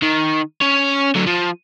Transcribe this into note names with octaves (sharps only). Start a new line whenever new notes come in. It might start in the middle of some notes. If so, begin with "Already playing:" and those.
D#3
C#4 C#5
D3 F#3
F3